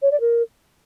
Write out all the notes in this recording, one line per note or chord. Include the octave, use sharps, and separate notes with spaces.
C#5
D5
A#4